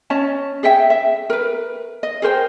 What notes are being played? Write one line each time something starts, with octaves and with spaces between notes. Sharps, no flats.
C#4 C#5 D#5 A5
G#4 D#5 E5 G5
E5
A#4 B4
D#5
G#4 A#4 C5 G5